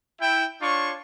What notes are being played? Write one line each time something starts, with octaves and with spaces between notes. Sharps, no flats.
E4 G5
D4 F4 C#5 C#6